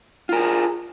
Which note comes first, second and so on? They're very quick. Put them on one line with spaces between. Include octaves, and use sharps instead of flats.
F4 A#4 G#4